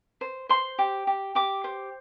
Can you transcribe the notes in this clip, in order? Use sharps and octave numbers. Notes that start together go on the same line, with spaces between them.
C5
C5 C6
G4
G4
G4 D6
C5